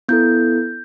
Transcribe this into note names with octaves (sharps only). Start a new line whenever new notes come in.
B3 E4 A4 G6